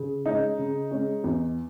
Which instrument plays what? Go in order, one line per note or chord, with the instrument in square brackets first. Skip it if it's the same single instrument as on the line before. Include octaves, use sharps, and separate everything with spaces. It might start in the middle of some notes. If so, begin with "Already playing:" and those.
Already playing: [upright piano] C#3
G#3 C#4 D#4
C#3
G#3 C#4
E2